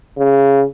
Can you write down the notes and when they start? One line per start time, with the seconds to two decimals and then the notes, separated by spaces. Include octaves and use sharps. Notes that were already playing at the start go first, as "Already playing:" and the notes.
0.18 C#3